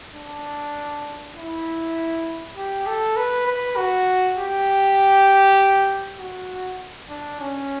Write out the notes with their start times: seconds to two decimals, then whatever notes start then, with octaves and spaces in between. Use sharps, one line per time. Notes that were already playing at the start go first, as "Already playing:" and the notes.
0.14 D4
1.36 E4
2.56 G4
2.87 A4
3.17 B4
3.47 B4
3.77 F#4
4.38 G4
6.19 F#4
7.10 D4
7.40 C#4